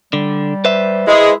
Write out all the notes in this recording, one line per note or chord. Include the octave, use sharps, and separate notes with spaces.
D3 G3
B4 C5 E5
G#3 E4 D#5